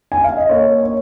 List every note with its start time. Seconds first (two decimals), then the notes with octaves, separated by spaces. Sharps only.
0.12 G#5
0.24 F5
0.37 D#5
0.49 A#3 C#5
0.83 C#5